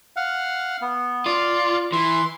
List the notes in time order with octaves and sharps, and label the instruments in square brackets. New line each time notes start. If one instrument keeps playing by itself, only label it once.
[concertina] F5 F#5
B3
[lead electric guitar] F4 [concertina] D5
[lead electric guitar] E3 [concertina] C6